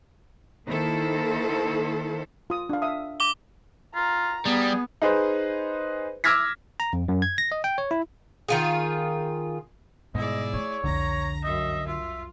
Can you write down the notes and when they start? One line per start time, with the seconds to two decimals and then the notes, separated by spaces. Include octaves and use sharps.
0.66 D#3 A#3 E4 A4 C5
2.50 F4 D#6
2.69 D4 F5
2.82 E5 F5 D#6
3.20 D6 G7
3.95 F4 A#5
4.46 G3 B3 G#4
5.02 D#4 G#4 B4 C5
6.24 D6 E6 F6 G#6 A#6 B6
6.80 A#5
6.93 F2
7.08 F#2
7.22 G#6
7.38 A#6
7.52 D#5
7.64 G5
7.78 C#5
7.91 E4
8.49 D#3 F4 G#4
10.15 G#2 B2 G3 E4 G#4 D5 D#5
10.54 A3 C#5
10.84 C2 F2 D3 A#5 A#6
11.44 F#2 D#5 E5
11.86 F4 E5